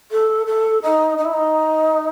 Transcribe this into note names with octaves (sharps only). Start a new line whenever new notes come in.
A4
A4
D#4
D#4
E4
D#4